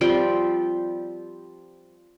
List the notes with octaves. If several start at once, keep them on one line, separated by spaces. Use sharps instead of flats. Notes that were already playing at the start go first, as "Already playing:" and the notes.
F3 G3 C4 G5